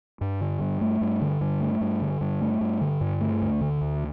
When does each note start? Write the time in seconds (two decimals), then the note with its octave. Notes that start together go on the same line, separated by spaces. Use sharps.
0.21 G2
0.41 D3
0.61 G2
0.81 A3
1.01 G2
1.21 D3
1.41 G2
1.61 A3
1.81 G2
2.02 D3
2.21 G2
2.41 A3
2.61 G2
2.81 D3
3.01 G2
3.21 A3
3.42 D2
3.61 D3
3.81 D2